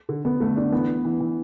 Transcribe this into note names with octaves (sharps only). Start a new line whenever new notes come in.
D3
D3 B3
D3 A3
D3 D4
E3 B3
B4
E3
E3